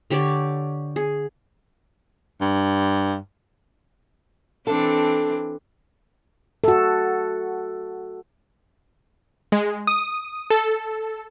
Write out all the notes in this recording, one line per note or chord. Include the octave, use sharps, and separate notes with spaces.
D3 G4 C#5 D5
G#4
G2
E3 C4 D4 A4
F#4 A4
G#3
D#6
A4